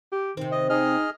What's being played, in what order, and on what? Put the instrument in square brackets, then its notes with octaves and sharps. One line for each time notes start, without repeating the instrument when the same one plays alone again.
[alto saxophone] G4
[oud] C3 C4 [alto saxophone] D#3
[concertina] D#5
[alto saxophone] D#4 [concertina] G#4 D#5 F6